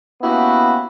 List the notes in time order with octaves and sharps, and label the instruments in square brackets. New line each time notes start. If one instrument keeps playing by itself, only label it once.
[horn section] A#3 B3 C#4 E4 F#4 G4